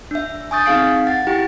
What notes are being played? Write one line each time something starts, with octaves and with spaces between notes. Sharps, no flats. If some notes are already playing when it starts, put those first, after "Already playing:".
D4 E5
G#5 C#6 D#6 G6 A6
C4 D#4 G#4 F5 C7 D7
F#5 A6
E4 G4 G5